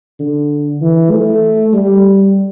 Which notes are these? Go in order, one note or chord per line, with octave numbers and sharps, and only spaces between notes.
D3
E3
A3
G3